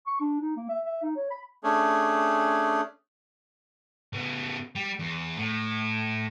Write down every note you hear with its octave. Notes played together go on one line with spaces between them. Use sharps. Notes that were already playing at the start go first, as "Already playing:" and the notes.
C#6
D4
D#4
A#3
E5
E5
D#4
C#5
B5
A3 C#4 D4 G#4
C#3 B3
G3
E2
A2